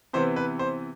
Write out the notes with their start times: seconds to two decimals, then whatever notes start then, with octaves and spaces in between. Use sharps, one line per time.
0.13 C3 E3 B3 C5
0.36 B4
0.59 C5